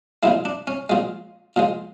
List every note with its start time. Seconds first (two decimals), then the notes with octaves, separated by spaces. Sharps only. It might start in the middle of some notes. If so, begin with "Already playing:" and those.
0.23 A#2 F3 G#3 E4
0.45 D4
0.67 C#4
0.90 A#2 F3 G#3
1.56 A#2 F3 G#3